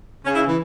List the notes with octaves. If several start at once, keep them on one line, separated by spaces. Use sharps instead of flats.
C#3 C#4
E4
E3